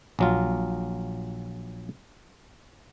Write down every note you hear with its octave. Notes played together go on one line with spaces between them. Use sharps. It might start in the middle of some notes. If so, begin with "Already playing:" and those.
A#1 F#3 F4